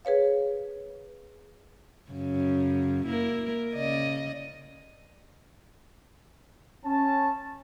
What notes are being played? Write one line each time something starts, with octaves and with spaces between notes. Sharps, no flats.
G#4 B4 C#5 F5
F#2 C#3
A#3 E4 A#4
C#3 D5 D#5
C#4 A5